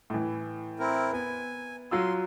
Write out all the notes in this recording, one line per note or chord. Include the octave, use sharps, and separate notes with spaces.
A2 E3
C4 E4 A#4
B3 G#5
F#3 F4 C6 E6